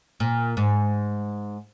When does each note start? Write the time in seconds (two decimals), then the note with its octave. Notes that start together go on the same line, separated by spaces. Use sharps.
0.20 A#2
0.57 G#2